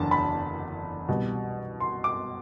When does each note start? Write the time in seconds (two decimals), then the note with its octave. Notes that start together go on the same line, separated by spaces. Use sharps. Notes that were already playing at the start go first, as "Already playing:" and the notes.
Already playing: F#1 E2 D3 F#3 A5
0.11 B5
1.09 C2 B2 G3
1.80 C6
2.04 D6